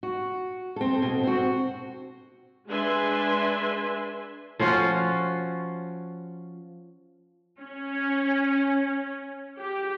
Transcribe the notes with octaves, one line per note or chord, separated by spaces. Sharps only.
F#4
C4 A4
B2
C4 F#4
G#3 D4 B4 E5 G#5 C6
F3 C#4 F4 F#4
C#4
G4